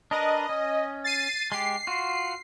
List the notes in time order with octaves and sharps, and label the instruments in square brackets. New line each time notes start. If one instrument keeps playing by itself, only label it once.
[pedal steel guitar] D4 A#4 B4 [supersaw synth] D#5
[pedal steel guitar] C#4
[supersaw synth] A6 C7 D#7
[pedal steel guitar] G#3 G4 [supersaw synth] C7
[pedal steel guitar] F4 F#4